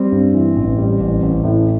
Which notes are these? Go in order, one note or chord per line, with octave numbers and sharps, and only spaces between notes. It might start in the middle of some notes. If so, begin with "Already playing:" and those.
Already playing: G3 C4
G2
E3
A1
G3
A1
A1
A2